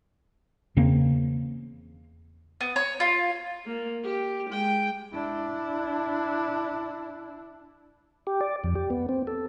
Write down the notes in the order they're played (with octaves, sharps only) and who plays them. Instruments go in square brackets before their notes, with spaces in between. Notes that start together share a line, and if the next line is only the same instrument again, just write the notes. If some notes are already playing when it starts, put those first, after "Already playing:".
[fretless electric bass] E2 C#3 A#3 C4
[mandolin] B3
C#5
F4
[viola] A#3
G4
G#3 G5
[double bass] D4 E4
[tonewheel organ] G4
D5
F2
G4
B3
C4
A4